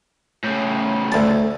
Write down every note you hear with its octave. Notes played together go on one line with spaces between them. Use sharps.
A2 C#3
D2 A5